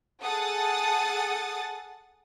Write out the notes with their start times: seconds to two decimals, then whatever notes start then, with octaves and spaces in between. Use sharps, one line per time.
0.22 G#4 A4 F#5 D#6 A6